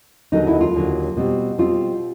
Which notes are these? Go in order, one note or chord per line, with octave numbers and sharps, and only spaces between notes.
D#2 D3 F#3 D#4
E4
F4
D#2 D3 F#3
B2 G3 C4
B2 G3 C4 F4